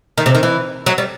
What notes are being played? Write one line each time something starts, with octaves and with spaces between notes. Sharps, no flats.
D#3
C3
D#3
E3
F#3
G3